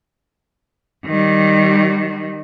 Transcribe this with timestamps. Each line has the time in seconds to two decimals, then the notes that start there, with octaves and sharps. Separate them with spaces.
1.06 D#3 G3